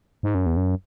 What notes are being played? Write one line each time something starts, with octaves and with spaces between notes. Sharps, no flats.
G#2
F#2
E2
F#2